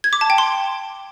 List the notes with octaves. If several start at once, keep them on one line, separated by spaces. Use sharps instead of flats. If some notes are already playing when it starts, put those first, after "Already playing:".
G#6
D6
A5
G5
C6